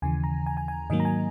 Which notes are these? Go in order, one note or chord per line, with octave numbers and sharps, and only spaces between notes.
D#2 C#3 E3 G#5
A#5
G#5
G#5
G#5
G#2 D#3 F#3 A#3 D#5
A#5
G#5